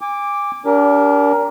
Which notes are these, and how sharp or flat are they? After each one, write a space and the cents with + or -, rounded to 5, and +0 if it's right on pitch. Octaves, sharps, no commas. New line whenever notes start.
G#5 -35 D6 +0
D4 -35 G4 +0 A#4 +5